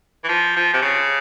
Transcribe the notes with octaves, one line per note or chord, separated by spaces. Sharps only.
E3
F3
F3
C3
C#3